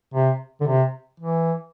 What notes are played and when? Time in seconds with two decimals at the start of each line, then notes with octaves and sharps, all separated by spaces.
0.14 C3
0.61 D3
0.67 C3
1.20 E3